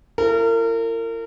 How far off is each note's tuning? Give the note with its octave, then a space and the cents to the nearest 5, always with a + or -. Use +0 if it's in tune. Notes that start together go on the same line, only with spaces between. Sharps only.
E4 +45 A#4 -35